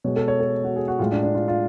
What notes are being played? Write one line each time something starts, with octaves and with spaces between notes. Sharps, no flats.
B2 G#3 C#5
A4
C#5
A4
F#4
G#4
F#4
A2 G#3 F4
D4
D4
F4
F4